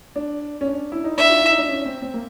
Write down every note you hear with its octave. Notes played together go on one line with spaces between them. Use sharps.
D4
C#4
D4
E4
D#4
D4 E5
F4
E4
D#4
D4
C#4
C4
C4
A#3